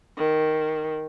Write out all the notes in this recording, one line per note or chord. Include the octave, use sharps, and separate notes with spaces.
D#3